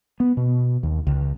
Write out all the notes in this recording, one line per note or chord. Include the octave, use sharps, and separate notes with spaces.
B3
B2
D#2
C#2